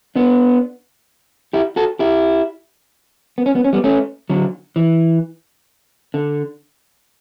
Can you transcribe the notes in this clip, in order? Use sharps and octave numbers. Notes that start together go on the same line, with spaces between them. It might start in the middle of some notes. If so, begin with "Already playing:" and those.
B3 D4
E4 G4
F#4 A4
E4 G4
B3
C#4
B3
C#4
G3 B3
A3 C#4
D3 F#3
E3
D3